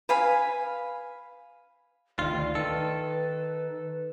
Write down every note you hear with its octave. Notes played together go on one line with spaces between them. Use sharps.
B4 F5 G#5 B5
D2 D#3 F4 D5
D#3 A4 B4